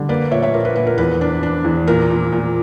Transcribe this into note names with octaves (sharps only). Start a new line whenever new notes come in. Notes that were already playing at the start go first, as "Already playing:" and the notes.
Already playing: D3 G3
A#3 B4 D5
A#2 C#5 E5
C#5 E5
A#2 A#4
B4
A#2 B4
A#4
E2 B4
D4
D4
E2
A#2 A#4
A#2
A#2